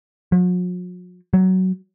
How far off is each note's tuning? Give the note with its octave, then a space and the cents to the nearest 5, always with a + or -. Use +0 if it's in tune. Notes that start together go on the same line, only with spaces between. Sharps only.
F#3 -45
F#3 +15